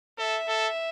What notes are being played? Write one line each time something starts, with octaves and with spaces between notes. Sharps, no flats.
A4 E5
A4